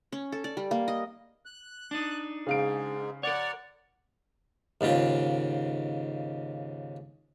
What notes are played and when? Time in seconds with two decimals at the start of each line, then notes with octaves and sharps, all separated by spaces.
0.12 C#4
0.32 A4
0.44 D5
0.57 G3
0.71 A#3
0.88 D#5
1.46 F#6
1.91 D4 D#4
2.47 G#2 C#3 G#3 F5 D7
3.23 A#4 C#5 D5 F#5
4.81 D#2 G#2 C#3 F4